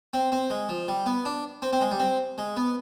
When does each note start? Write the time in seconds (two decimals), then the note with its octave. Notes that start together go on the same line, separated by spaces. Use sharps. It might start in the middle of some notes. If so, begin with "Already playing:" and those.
0.13 C4
0.32 C4
0.50 G#3
0.69 F3
0.88 G3
1.06 B3
1.25 D4
1.62 C4
1.73 C4
1.81 G#3
1.91 G3
1.99 C4
2.38 G#3
2.57 B3